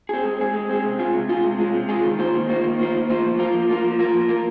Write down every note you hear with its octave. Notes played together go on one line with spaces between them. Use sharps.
C4 G#4
G#3
C4 G#4
G#3
C4 G#4
C3
G#3 F4 G#4
C3
G#3 F4 G#4
C3
G#3 F4 G#4
C3
G#3 F4 G#4
D#3
A#3 F4 C5
D#3
A#3 F4 C5
D#3
A#3 F4 C5
D#3
A#3 F4 C5
F3
A#3 F4 A#4
F3
A#3 F4 A#4
F3
A#3 F4 A#4
F3
A#3 F4 A#4